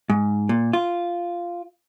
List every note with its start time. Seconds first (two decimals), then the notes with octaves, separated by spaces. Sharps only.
0.10 G#2
0.49 A#2
0.73 F4